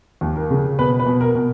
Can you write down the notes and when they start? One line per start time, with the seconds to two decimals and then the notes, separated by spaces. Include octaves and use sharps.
0.21 D#2
0.36 A#4
0.51 C#3
0.79 B2 B4
1.00 B4
1.06 B2
1.21 A#4
1.35 B2